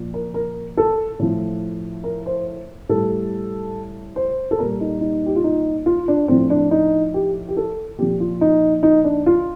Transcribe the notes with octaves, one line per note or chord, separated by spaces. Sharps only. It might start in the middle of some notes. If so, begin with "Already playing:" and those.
Already playing: A#2 F3
A#4
A#4
A4
A2 F3
A#4
C5
A2 G3 A4
C5
A4
A#2 G3 A#4
D#4
D#4
G4
F4
D#4
F4
D4
A2 F3 C4
D4
D#4
G4
G4
A4
A#2 F3 G4
F4
D#4
D#4
D4
F4